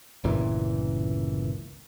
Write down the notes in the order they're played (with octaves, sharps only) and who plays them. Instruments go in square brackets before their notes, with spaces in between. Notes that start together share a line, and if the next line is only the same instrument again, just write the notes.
[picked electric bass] G1 C#2 A#2 E3